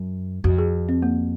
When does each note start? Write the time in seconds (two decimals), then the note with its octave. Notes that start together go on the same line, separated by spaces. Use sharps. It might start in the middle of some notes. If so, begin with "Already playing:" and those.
Already playing: F#2
0.44 F2 F#4
0.58 G#4
0.89 C4
1.02 A#3